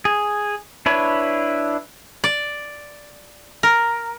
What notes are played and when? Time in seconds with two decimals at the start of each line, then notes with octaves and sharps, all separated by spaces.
0.05 G#4
0.86 D4 E4 B4 C#5
2.24 D5
3.63 A#4